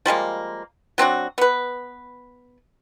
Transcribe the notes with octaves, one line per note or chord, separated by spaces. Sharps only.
F3 G3 G#3 A#3
F#3 C4 D4 F#4
B3 B4